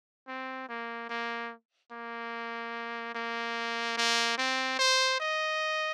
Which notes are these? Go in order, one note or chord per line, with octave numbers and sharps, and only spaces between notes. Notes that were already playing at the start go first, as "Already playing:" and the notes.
C4
A#3
A#3
A#3
A#3
A#3
C4
C5
D#5